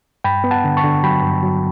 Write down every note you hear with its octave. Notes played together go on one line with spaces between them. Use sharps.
G2 G5 B5
B3
F#5 A5
D3
A5 C#6
D3
F#3 G5 B5
G2
F#3